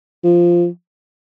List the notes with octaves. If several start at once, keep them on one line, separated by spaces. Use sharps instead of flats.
F3